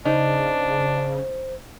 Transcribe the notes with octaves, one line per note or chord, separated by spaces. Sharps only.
C#3 D4 D#4 C5